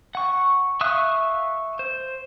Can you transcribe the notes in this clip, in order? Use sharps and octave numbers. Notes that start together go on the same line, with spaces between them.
F#5 C#6
E5 F5 C#6 D#6 F#6
C5